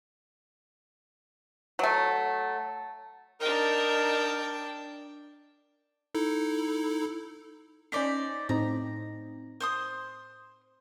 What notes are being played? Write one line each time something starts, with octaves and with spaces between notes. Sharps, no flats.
F#3 A3
D4 D#4 A#4 G5
D#4 E4 A4
C#4 D#4 C5 D5 B6
A2 C4 D#4 A#5
C5 C6 D#6